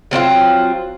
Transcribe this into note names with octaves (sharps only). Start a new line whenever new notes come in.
F#3 C4 D#4 F4